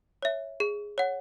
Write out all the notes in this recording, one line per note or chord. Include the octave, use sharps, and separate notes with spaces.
C#5 E5
G#4
C#5 F#5